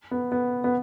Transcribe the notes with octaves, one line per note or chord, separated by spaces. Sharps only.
B3
B3
B3